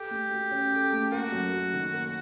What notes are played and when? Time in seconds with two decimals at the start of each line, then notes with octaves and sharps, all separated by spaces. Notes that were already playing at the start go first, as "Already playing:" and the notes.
Already playing: G4 A4
0.11 A3
0.32 F#4
0.51 C#4
0.73 A4
0.93 A3
1.12 A#3 F#4
1.32 F#2
1.54 F#3
1.73 D#3
1.94 A#3